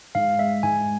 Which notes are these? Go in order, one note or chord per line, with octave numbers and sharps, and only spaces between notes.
G#2 F5
G#3 E5
G#2 G#5